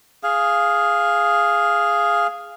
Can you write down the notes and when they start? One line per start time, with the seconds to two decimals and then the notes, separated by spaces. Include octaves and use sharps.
0.23 G#4 F5